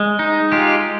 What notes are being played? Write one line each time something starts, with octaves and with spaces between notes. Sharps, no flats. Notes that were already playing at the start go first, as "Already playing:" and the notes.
Already playing: G#3
D#4
G#3 F4 G4